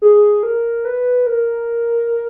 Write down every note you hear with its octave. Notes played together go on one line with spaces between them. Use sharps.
G#4
A#4
B4
A#4